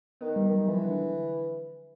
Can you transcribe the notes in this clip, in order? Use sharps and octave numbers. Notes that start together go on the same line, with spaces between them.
D#3 B3
G3
D#3
F#3
E3 F3
D3